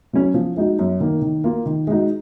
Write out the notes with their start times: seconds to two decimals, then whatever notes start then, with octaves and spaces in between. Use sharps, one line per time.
0.13 F#3 C#4
0.34 F3
0.57 G#3 D#4 F#4
0.79 F#2
1.00 D#3 A#3
1.22 D#3
1.44 A#3 F4
1.66 D#3
1.87 G#3 D#4 F#4